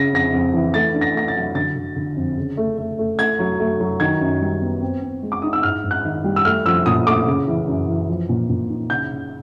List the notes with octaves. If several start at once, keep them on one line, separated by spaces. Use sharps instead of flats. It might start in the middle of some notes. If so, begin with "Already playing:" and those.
Already playing: C#3 A#6
F2 A#6
F2
E3
A3 A6
D4
A#6
A3 A#6
A6
F#3
D3 A6
D3
D3
F2
C#3
A3
A3
A3
A3 G#6
F#3
A3
F#3
D#3 G#6
F#2
G3
B3
C4
C4
G#3
D6
D#4 D#6
E6
G#2 F6
G#2
F#6
D#3
G3
E6
A3 F6
F3 E6
A#2 D#6
A3 D6
C#3
E3
F#2
E3
F3
A#2
A#2
D#4
C#3 G6
C#3